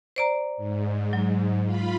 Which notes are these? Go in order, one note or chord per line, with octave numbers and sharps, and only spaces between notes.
C5 D5 A#5
G#2
F#3
F4 B5